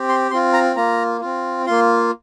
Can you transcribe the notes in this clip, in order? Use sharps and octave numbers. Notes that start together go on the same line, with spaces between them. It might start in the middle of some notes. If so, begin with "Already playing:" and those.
Already playing: C4 G4
C6
C4 F4 C6
A#5
A#3 F4 A#5
C4 F4
A#3 F4 C6